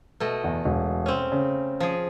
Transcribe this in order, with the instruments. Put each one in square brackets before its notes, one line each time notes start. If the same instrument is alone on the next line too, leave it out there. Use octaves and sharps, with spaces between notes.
[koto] B2 A3 D#5
[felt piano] E2
E1
[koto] C4 C#4
[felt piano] C#3
[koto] F3 G#4